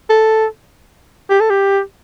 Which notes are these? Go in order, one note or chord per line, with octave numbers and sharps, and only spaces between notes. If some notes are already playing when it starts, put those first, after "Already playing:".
A4
G4
A4
G4